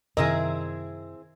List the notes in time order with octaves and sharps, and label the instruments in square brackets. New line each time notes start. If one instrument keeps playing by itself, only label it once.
[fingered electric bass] F#2 C3 D#3 [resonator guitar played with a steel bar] C4 E4 G#4 [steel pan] A#4 D#5